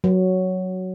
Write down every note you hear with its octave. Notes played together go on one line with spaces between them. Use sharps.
F#3